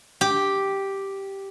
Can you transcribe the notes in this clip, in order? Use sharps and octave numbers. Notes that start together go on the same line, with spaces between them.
G4